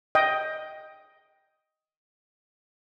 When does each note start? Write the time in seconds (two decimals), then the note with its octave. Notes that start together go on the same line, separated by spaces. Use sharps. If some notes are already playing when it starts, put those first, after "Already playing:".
0.15 D#5 G5